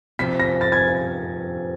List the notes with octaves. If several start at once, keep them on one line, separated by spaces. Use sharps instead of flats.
F2 C3 F3 B6
A#6
A6
G#6